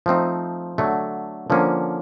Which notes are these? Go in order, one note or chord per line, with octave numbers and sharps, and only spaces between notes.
F3 A3 C4 D#4
D3 F#3 A3
D3 F3 A#3 C#4